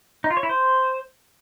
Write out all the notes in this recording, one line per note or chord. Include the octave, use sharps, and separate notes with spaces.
D#4
F4
C#5
E4
C5